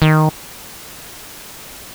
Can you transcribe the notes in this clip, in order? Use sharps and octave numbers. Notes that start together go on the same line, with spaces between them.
D#3